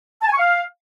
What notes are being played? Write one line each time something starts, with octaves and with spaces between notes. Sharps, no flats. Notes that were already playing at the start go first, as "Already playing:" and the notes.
A5
G#5
C#6
F5